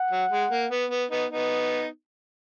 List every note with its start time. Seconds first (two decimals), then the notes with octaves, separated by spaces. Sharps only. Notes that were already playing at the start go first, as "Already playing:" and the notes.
Already playing: F#5
0.11 F#3
0.31 G#3
0.51 A#3
0.71 B3
0.90 B3
1.11 B3 D#4
1.31 B3 D#4